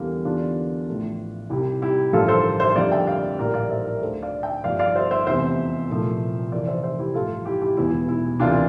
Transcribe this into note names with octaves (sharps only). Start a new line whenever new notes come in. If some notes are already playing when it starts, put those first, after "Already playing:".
Already playing: E2 D3 G3 A#3
E2 D3 G3 A#3 D4 F4
A1 A2 F3 A3
C2 C3 G3 E4 G4
E4 G4
A1 G2 D3 F3 A#3 F4 A4
A4 C5
C5 E5
F2 D3 G3 A#3 D5 F5
E5 G5
D5 F5
A#1 A2 G3 A#3 A#4 D5
D5 F5
C5 E5
A#4 D5
D2 D3 A3 A4 C5
D5 F5
E5 G5
G1 G2 F3 D5 F5
D5 F5
C5 E5
C5 E5
F1 E2 C3 C5 E5
C2 A#2 F3 A3
F1 F2 E3 A#3 A#4 D5
C5 E5
C5 E5
E4 G4
A1 G2 F3 A3 F4 A4
E4 G4
E4 G4
E1 E2 E3 E4
E4
D2 C3 E3 A#3 D4 F4